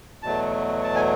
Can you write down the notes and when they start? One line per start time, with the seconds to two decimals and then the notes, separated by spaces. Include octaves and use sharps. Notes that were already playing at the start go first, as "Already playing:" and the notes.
0.23 E2 B2 F#3 A3 A5
0.84 A5
0.96 G#5